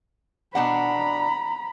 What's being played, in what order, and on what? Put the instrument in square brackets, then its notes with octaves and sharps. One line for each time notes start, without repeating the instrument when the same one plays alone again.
[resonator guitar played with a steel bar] B2 D4 F#5 [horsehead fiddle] A#5 B5